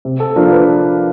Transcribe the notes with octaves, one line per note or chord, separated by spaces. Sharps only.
C3
A4
F3 A#3 D4 F4 A#4
B4